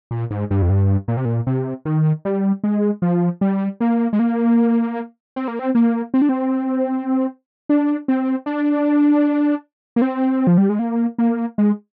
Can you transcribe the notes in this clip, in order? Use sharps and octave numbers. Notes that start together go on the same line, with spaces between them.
A#2
G#2
G2
F2
G2
A#2
C3
A#2
C3
D#3
G3
G#3
F3
G3
A#3
G#3
A#3
C4
A#3
C4
A#3
C4
D4
C4
D4
C4
D4
A#3
C4
F3
G3
G#3
A#3
A#3
G#3